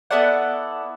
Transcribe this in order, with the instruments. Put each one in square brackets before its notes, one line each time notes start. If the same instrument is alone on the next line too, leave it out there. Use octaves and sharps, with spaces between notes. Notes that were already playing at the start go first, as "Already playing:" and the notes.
[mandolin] B3 E4 A4 D5 F#5